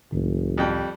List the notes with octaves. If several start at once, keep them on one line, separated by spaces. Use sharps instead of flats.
F#1 C#2 A2 D#3
F2 G3 G5